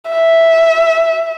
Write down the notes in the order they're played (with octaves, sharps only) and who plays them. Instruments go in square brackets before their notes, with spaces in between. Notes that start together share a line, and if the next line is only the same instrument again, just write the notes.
[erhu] E5